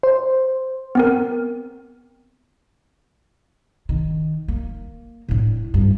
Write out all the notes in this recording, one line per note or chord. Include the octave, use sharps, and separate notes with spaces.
C5
B3 C4 A#4
D#3
A#3
A2 D4
G2